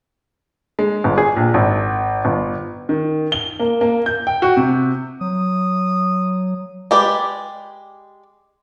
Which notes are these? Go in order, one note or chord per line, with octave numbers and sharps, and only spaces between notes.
G#3
G1
G#4
A#1
G#1
G1
D#3
G7
A#3
A#3
G6
G5
F#4
C3
F#3 D#6
G#3 G4 B4 D5